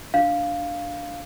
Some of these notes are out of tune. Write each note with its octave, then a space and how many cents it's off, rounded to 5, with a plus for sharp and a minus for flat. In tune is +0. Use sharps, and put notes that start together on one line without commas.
D4 +0 F5 +0